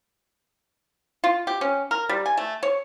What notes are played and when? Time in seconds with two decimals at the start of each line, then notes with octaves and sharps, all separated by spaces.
1.24 F4
1.47 G4
1.61 C#4
1.91 A#4
2.09 G3
2.26 G#5
2.38 A3
2.63 C#5